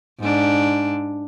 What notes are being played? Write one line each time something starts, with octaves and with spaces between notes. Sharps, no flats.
G#2 D4